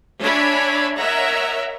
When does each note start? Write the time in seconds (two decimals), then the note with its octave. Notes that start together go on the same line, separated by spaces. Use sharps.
0.22 D4 C#5 E5 G#5 B5
0.95 A#4 C#5 D#5 E5 F#5 A#5